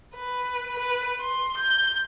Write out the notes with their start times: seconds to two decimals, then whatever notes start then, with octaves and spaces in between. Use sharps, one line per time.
0.15 B4
0.79 B4
1.21 C6
1.57 G6